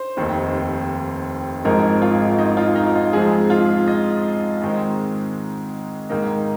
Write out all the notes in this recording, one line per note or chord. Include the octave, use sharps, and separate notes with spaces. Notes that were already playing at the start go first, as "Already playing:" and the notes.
Already playing: C5
F1 D#2 D#3 C4
G#1 G#2 F3 C4 D#4 A#4
F4
D#4
F4
D#4
F4
G#2 F3 G#3 C4 G#4
F4
D#5
G#2 D#3 G#3 C4
G#2 D#3 A#3 D#4